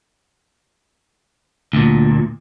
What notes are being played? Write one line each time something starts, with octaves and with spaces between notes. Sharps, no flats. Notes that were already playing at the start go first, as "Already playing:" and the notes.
D2 A#2